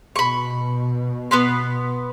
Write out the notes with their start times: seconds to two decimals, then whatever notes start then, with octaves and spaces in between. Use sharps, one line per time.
0.16 B2 B5 C#6
1.31 B3 B4 C6